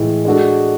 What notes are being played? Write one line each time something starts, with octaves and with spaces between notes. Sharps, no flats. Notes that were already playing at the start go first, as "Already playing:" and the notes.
Already playing: A2 E3 G#3
G#3 D4 F#4 A4